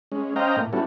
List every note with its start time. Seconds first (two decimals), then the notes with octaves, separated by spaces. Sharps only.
0.12 G#3 C#4
0.36 C#4 C5 D#5 F5 G5 A#5
0.56 A2 A#3
0.73 G3 B3 C#4 E4 F#4 A4